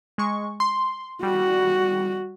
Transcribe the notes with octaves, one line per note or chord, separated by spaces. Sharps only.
G#3 C#6
C6
G3 F#4